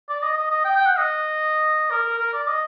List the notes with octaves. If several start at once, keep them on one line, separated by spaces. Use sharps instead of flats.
D5
D#5
D#5
D#5
G5
G5
F#5
D#5
A#4
A#4
A#4
D5
D#5